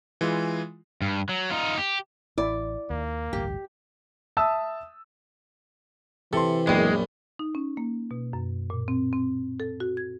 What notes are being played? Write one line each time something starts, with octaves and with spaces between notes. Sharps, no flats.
E3 G#3 F4
G2
F#3
D#4 F4
G4
A1 E4 D5
D#2 D#3 A#3
A1 D2 G2 G4
E5 A5 D#6 E6
C3 E3 A4 C6
A#1 F#2 G#3 B3 D4 G5
D#4
C#4
A#3
B2
F#2
A#2
C4
C4
A4
F#4
G#6